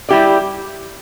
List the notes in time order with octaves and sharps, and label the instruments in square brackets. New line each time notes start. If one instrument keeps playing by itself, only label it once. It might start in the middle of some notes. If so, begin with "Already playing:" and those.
[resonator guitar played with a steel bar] G3 E4 G4 D5